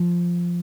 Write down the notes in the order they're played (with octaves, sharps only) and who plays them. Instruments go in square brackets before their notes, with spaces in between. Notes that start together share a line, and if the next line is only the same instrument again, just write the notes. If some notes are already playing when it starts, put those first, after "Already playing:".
Already playing: [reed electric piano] F3